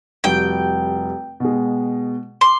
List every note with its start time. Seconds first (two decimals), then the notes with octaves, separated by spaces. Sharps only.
0.24 F1 G3 F#4 G5
1.40 B2 G#3
2.41 C6 D6